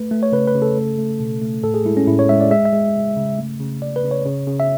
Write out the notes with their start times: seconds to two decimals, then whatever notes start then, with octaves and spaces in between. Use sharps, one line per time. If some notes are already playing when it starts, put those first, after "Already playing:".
Already playing: A3 B4
0.11 A3
0.23 C#5
0.32 C#3 B4
0.47 B4
0.55 C#3
0.62 A4
0.77 A3
0.99 A3
1.20 B2
1.42 A3
1.64 A2 A4
1.74 G#4
1.85 G#3 E4
1.97 C#4
2.07 A2 E4
2.19 C#5
2.29 G#3 E5
2.40 D5
2.51 G#3 E5
2.65 E5
2.73 G#3
2.95 C#3
3.17 C#3
3.39 A3
3.60 C#3
3.82 C#3 D5
3.96 B4
4.04 C#3
4.11 C#5
4.25 C#3
4.47 C#3
4.60 E5